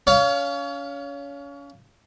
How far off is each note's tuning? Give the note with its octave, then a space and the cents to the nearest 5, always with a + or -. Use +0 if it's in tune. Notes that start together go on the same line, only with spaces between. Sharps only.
C#4 +30 C#5 +30 F5 -5